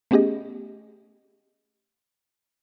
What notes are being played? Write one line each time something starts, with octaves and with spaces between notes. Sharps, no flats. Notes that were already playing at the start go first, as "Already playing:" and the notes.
A3 B3 C#4 G4 G#4 D#5